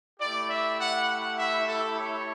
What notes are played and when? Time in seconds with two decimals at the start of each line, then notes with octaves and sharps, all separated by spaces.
0.20 A3 E4 G4 D5
0.50 E5
0.79 F#5
1.09 F#5
1.38 E5
1.68 A4
1.97 C#5